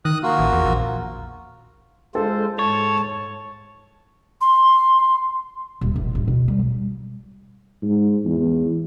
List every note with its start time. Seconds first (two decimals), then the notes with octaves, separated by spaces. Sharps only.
0.05 D#3 D#6 F#6
0.23 A#3 F4 F#4
0.39 A1
0.53 E2
0.65 A#1
2.15 G#3 F4 A4 C5
2.59 G#2 C#5 A5
4.41 C6
5.81 D#1
5.96 F1
6.15 D1
6.28 B1
6.48 G3
7.82 G#2
8.25 E2